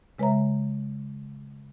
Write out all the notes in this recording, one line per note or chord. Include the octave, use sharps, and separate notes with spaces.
C#3 G#3 B4 C#5 E5 A#5